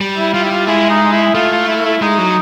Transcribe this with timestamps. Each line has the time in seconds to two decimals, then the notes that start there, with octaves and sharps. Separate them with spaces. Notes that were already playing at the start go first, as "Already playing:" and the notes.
0.01 G3
0.17 E4
0.34 G3 F4
0.45 E4
0.51 F4
0.67 G#3 E4
0.90 D#4
1.12 E4
1.35 A3 F4
1.52 F4
1.68 E4
1.85 E4
2.02 G#3 D#4
2.18 F#3